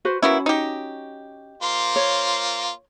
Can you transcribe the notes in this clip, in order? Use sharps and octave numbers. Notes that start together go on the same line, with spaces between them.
F#4 B4 C5
A#3 B3 C#4 E4 F#4
D#4 G4
A#3 F4 C5
C#5